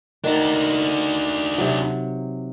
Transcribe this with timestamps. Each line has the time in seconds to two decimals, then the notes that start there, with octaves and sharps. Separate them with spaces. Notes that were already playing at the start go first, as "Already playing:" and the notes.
0.24 D#3 D4 F#4
1.58 C3 F#3